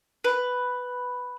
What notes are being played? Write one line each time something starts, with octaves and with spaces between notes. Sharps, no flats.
B4